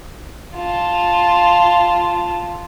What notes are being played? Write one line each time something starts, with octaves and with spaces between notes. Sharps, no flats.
F4 A5